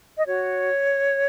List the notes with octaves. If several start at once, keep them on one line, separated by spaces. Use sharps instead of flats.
D#5
F#4 C#5